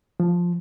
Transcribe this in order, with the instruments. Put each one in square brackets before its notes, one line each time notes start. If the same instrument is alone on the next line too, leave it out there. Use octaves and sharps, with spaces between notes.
[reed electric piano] F3